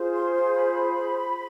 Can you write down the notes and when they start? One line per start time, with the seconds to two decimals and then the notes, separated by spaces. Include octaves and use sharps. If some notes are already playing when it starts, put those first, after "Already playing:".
Already playing: F4 G#4 C5
0.14 C6
0.34 C6
0.55 B5